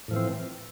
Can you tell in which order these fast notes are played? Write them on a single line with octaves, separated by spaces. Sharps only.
A2 F3 E3 C4